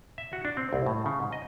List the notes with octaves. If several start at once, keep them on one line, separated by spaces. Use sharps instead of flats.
E5
F#4
D4
C4
C2
A2
C#3
G#2
D#5